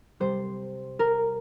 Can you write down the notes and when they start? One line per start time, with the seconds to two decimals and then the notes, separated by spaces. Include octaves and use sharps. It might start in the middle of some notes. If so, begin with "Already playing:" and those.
0.20 C3 G3 C5
0.99 A#4